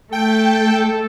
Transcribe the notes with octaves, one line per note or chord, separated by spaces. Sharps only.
A3 A4 G5